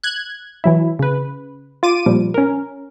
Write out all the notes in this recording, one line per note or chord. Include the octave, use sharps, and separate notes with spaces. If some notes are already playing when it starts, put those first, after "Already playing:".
F#6 G#6
E3 F#3 E4
C#3 B4
F4 D6 D#7
A#2 F3 G3
C#4 A#4